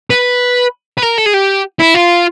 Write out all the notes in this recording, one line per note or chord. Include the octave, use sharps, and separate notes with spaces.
B4
B4
A#4
A4
G#4
G4
E4
F4